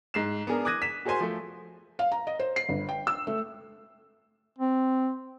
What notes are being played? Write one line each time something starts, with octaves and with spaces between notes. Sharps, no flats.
G#2 C7 E7
B3 D4 G#4 A#4
D6 D#6 F#6 G#6 A#6 D#7
B6 E7
F#4 G#4 A#4 C5 G#5 C6
F3 A3
F5
A#5
D#5
C5
C7
G1
G5
E6
A3
C4